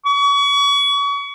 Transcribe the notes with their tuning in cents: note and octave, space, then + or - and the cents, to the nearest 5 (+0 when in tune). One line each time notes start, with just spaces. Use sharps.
C#6 +35